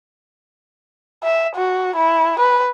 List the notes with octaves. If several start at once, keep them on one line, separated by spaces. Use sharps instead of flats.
E5
F#4
E4
B4